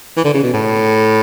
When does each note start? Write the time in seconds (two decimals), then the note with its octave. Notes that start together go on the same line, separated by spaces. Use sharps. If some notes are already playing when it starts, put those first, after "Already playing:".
0.17 E3
0.25 D3
0.34 C#3
0.43 B2
0.54 A2